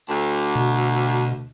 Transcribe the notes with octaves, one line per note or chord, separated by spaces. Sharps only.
D2
B2